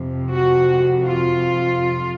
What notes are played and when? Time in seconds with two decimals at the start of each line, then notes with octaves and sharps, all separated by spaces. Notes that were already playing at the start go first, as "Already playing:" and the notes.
Already playing: F2 C3 F3
0.33 F#4
1.06 F4